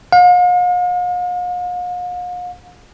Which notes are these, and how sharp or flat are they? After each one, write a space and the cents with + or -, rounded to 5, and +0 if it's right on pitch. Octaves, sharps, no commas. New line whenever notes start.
F5 +45